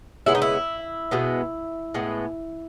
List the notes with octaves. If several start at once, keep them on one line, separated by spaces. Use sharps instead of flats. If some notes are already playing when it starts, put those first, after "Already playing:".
C#3 G#3 B3 E4
D#4
E4
B2 G#3 B3
A2 G#3 B3